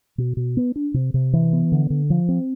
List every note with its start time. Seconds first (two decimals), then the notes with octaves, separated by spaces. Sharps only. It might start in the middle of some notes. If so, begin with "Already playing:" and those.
0.18 B2
0.37 B2
0.57 B3
0.76 D4
0.94 C3
1.14 C3
1.33 E3
1.53 B3
1.72 D3
1.90 D3
2.10 F3
2.29 C4